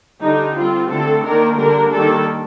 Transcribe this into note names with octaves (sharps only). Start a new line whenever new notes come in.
D3 G3 D4 D#4
G3 C4 F4
D3 A3 C4 A4
D#3 A#3 D4 A#4
D3 G3 A#3 D4 A#4
D#3 G3 A#3 D4 A4